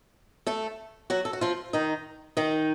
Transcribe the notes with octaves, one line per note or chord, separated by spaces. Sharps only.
A3 A4
F#3 F#4
A4
F#4
F3 F4
D#3 D#4
D#3 D#4